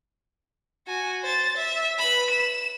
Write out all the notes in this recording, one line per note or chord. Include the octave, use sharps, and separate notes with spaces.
F#4 G#5
C5 A6
E5
B4 B5
E7